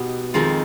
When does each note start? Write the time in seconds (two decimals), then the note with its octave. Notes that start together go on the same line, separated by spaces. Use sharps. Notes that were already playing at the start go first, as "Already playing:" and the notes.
Already playing: B2 B3 D#4 G4
0.34 F2 D#3 G#3 C4 F4